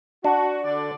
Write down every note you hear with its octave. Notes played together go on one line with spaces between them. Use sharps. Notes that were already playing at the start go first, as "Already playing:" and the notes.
D4 F#4
D3 D5